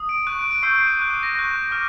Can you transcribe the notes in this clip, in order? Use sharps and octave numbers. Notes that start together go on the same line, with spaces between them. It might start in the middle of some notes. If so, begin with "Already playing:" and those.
Already playing: D#6
D7
C#6 F#6 D#7
D7
D7
C#6 E6 G6 C7
D7
D#7
D6 F#6 D7
D#7
A#6
C#6 F#6 A#6
D6 F6